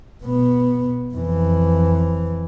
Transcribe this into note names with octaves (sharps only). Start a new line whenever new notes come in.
B2 B3
F2 E3